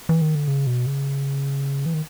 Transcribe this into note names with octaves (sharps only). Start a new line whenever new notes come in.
E3
D#3
D3
C#3
B2
C#3
E3
D#3